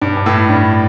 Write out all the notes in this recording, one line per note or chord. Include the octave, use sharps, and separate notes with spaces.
G2
G2
A2
G2